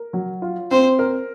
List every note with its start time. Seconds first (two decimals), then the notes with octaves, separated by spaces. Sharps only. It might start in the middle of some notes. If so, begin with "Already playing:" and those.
Already playing: A#4
0.13 F#3
0.42 F4
0.71 C4 C5
0.99 A#4